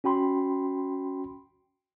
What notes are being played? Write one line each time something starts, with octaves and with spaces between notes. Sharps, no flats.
C#4 F#4 G5 B5 C6